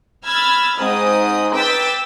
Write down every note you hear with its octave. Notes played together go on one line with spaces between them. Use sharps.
B5 E6 F6 G#6 A6
G#2 C4 D#6
B4 G5 D6 E6 A6 B6